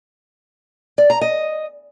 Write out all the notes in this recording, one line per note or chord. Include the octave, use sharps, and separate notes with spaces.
D5
A#5
D#5